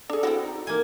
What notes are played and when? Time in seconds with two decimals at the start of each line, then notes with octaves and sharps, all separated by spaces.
0.10 D4 G#4 A4
0.23 C4 E4 F#4
0.44 D#4
0.67 A#3 D#4 G#5